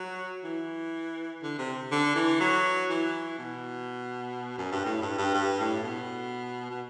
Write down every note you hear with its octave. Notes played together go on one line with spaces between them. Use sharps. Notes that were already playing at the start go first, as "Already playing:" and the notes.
Already playing: F#3
E3
D3
C3
D3
E3
F#3
E3
B2
F#2
G2
A2
G2
G2
G2
A2
B2
B2